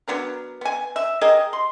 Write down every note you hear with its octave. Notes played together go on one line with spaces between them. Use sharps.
F#3 B3 D4 A#4
B3 G#5
E5
G4 G#4 A#4 D#5
C6